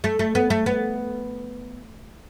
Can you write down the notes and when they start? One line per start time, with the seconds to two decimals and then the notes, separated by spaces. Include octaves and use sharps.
0.04 A3
0.19 A3
0.35 B3
0.50 A3
0.66 B3